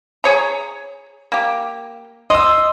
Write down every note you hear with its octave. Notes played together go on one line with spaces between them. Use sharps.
G#4 C#5 A#5
A#3 G4
D#5 C6 E6